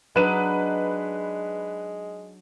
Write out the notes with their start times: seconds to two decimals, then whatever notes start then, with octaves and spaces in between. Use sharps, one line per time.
0.16 F#3 G#3 D4 D#4 B4 D#7